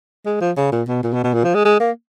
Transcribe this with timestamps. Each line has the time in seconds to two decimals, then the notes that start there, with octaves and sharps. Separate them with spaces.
0.26 G#3
0.41 F3
0.57 C#3
0.72 A#2
0.88 B2
1.03 A#2
1.13 B2
1.24 B2
1.34 A#2
1.44 F3
1.55 G#3
1.65 G#3
1.80 A#3